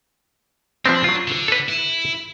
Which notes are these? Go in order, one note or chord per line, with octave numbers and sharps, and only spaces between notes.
F3 B3 C4 D4
F#3 F4
D3
A4 B4
E4